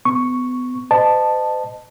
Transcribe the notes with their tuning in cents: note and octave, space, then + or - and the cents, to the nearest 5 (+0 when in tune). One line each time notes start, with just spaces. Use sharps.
B3 +30 C#6 +0
C5 -40 D#5 -30 A5 +0